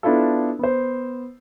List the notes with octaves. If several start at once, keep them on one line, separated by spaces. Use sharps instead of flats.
B3 D4 E4 F4 A4
B3 C5